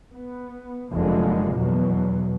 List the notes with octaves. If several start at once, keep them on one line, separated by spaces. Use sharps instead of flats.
B3
F1 F#2 D3 G#3 A#3
E2 B2 F#3